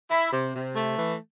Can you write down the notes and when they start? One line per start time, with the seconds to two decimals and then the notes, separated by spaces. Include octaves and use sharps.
0.11 E4
0.33 C3
0.55 C3
0.75 A3
0.98 E3